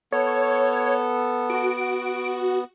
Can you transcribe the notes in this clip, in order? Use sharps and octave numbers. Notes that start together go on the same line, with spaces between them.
B3 A4 C#5
F#4 D7